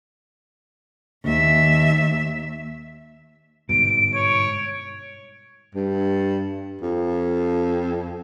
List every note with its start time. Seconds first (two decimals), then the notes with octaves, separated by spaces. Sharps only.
1.24 D#2 E5
3.69 G1 G#2 B2 D7
4.15 C#5
5.75 G2
6.82 F2